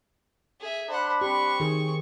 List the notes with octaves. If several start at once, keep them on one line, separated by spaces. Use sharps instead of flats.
G#4 E5
D4 C5 F#5 B5
C4 G4 C#6
D#3 G#4